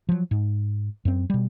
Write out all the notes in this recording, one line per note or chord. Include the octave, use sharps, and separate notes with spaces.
F3 F#3
G#2
F#2 C4
B2 G3